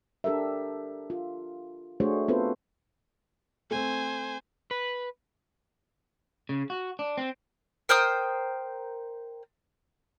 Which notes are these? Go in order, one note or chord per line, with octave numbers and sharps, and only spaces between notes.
D4 G4 A4 A#4 E5
F4
A3 D4 F#4 G#4 C5 C#5
B3 C4 F4 A4 B4 C5
A3 C4 C5 G#5
B4
C#3
F#4
D4
C4
A#4 C5 G5 D#6